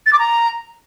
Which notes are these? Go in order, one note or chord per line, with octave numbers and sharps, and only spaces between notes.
A6
D6
A#5